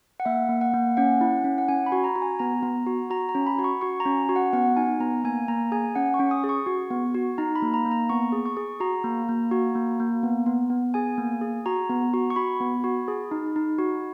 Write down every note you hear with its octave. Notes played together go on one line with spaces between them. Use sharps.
F#5
A#3 E5
A#3
F#5
A#3
C#4 F#5
E4
C#4
F#5
C#4 G#5
B5
F#4
A#5
F#4
G#5
B3 A#5
B3
F#4
F#4 A#5
A#5
C#4
B5
F#4
C#6
F#4 C#6
A#5
C#4
F#4
F#5
B3 F#5
D#4 G#5
B3 A#5
A#3 G#5
A#3 A#5
G#4 G#5
C#4 F#5
C#6
C#4
D#6
G#4
C#6
F#4
B3
F#4
D#4 A#5
B5
A#3
A#5
A#3
A#5
B3 C#6
G#4
C#6
G#4
F#4 A#5
A#3
A#3
F#4
A#3
A#3
B3
B3
B3
G#4 G#5
A#3
G#4
F#4 A#5
B3
F#4
C#6
F#4 B5
B3
F#4
G#4
D#4
D#4
F#4